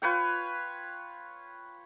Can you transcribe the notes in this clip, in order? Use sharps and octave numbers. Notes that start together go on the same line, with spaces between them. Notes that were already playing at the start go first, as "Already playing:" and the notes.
F4 B4 C#5 G5